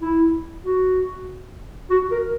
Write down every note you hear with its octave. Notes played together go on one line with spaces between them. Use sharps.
E4
F#4
F#4
A#4